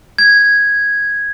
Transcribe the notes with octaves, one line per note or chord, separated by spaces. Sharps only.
G#6